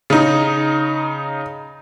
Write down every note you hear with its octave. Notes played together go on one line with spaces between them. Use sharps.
C#3 D#4